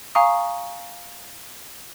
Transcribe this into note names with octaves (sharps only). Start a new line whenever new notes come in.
F5 G#5 A#5 C#6 D#6